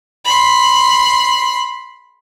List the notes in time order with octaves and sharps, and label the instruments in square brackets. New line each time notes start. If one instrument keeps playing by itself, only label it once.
[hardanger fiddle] B5 C6